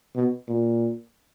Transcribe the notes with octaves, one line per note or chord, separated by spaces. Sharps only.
B2
A#2